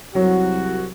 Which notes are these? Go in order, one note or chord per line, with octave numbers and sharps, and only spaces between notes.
C2 F#3 F#4